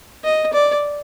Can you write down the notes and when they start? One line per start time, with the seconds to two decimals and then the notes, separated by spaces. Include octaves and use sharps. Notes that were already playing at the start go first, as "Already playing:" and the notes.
0.24 D#5
0.53 D5